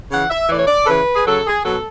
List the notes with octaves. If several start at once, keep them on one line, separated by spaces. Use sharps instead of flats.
C#3 E3 F#5
E5
A2 E3 C#5 D5
D5
A4
C#3 E3 B4
G#4
C#3 F#3 A4
G#4
B2 F#3 A4